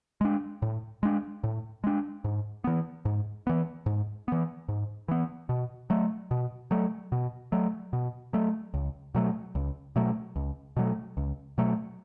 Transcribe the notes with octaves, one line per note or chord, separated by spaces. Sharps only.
G#3 D4
A2
G#3 D4
A2
G#3 D4
G#2
E3 B3
G#2
E3 B3
G#2
E3 B3
G#2
E3 B3
B2
F#3 A3
B2
F#3 A3
B2
F#3 A3
B2
F#3 A3
C#2
B2 F#3 A3
C#2
B2 F#3 A3
C#2
B2 F#3 A3
C#2
B2 F#3 A3